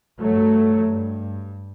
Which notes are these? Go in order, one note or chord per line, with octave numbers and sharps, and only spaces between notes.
G2 F#3 A3
G2